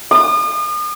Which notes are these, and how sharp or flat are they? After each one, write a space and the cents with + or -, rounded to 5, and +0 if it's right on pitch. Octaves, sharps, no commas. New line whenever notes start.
D#6 -40